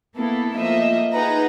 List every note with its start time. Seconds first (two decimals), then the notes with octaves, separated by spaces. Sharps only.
0.17 A#3 B3 E4 A4
0.55 F3 A3 A#3 D#5 E5
1.12 D#4 G#4 B4 F#5 A#5